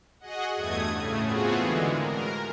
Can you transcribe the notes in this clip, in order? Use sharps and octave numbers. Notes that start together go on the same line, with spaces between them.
F#4 G#4 D#5 F#5
E2 G2 A3 D#6 G#6
A2 C#3 A3
B3 C4 F4 F#4 G#4
D3 E3 G#3
A#4